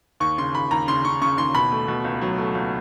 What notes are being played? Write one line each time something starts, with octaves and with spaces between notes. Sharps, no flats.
D#2 C#6
C#3 C6
D#2 B5
D#2 A#5
C#3 C6
C#3 C#6
C#3 C#6
D#2 C6
B2 B5
A3
B2
C#2
F#3
A3
C#2